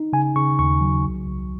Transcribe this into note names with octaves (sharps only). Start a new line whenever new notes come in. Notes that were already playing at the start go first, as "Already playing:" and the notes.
Already playing: D#4
C#3 G#5
C#3 C#6
D#2 C#6
F#3
C2
C2